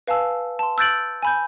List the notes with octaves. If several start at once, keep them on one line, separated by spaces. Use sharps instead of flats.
B4 F5 G#5 A5 E6
A5 C6
E6 F#6 G6 A6 D7 F#7
G#5 B5 G6